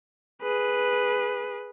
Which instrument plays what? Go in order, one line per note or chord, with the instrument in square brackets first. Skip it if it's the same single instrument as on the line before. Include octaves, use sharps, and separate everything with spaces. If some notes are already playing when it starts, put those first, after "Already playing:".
[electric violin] G#4 B4